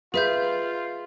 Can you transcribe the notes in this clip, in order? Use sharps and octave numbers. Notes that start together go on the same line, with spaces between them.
F4 G#4 B4 E5 G6